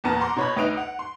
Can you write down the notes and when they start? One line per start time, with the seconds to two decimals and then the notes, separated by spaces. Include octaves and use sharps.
0.04 E2 A#2 B3 A5 A#5 F6
0.20 F#5 A#5 C6 D6
0.36 B2 C#5 B5
0.56 D2 D#4 B4 D7 F7
0.77 F#5
0.99 C6